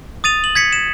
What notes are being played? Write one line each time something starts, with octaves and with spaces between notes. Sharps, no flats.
D#6 A6 D#7 F7
F#7
G#6 B6 C#7
E7